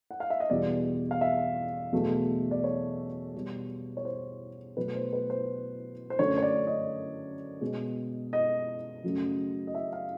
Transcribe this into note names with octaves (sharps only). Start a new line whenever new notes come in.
F#5
F5
E5
D#5
E2 B2 G3 D5
F5
E5
E2 B2 F#3 A3
D5
C#5
B2 G3
C#5
C5
B2 F#3 A3 B4
C5
B4
C5
C5
F#2 D3 F#3 A3 C#5
C#5
D5
D#5
B2 G#3
D#5
F#2 C#3 F#3 A3
D#5
E5
F5